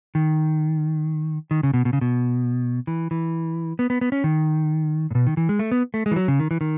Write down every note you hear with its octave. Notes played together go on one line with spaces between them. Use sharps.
D#3
D#3
C#3
B2
B2
C#3
B2
E3
E3
B3
B3
B3
C#4
D#3
A2
B2
D#3
E3
G#3
A3
B3
A3
G#3
E3
F#3
C#3
D#3
E3
D#3